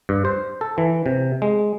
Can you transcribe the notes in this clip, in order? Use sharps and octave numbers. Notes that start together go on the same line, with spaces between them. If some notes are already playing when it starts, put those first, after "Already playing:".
G2
C5
A4
E3
C3
G#3